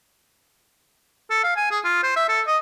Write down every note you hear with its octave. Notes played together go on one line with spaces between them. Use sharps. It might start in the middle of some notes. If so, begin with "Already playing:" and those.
A4
F5
G#5
G#4
F4
C5
E5
A4
D#5